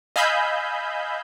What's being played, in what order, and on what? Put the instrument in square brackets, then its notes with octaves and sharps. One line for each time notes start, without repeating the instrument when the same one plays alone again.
[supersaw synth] D#5 F5 G#5 B5 E6 G6